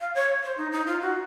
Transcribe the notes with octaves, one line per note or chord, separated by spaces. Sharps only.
F5
C#5
C5
D#4
D#4
F4
F#4